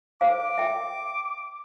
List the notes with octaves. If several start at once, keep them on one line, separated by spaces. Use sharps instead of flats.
C5 F5 D6
E5 G5